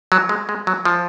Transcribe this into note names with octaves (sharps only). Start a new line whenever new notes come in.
F#3
G#3
G#3
F#3
F3